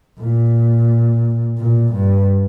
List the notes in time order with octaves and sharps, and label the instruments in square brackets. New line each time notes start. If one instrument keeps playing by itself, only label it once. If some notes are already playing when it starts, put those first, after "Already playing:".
[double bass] A#2
A#2
G2